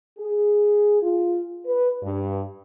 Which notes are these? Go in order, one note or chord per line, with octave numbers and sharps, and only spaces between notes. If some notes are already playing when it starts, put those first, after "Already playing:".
G#4
F4
B4
G2